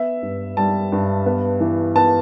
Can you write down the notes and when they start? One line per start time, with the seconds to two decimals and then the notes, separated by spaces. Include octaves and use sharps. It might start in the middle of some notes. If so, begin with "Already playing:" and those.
Already playing: B3 E5
0.22 G2
0.57 G3 A5
0.92 G2
1.26 B3
1.60 E3
1.96 B3 A5